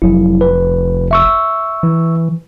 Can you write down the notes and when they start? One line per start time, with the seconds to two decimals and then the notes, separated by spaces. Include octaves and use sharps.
0.02 F1 F#3 E4
0.41 B4
1.11 E5 C#6 E6
1.83 E3